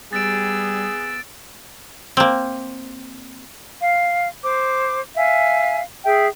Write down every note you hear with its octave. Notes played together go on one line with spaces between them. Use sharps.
G3 B3 G#4 E6 A6 D7
A#3 C4
F5
C5 D6
E5 F5 G#5
G#4 E5 G5